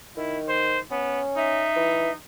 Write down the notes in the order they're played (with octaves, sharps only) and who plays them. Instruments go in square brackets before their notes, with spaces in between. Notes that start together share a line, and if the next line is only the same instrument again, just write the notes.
[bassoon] D#3 [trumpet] E4
[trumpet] C5
[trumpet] B3 [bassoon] C#4
[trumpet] D#4 [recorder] E5
[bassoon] E3